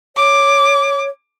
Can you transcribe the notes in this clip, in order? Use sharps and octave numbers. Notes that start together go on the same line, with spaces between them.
C#5 D6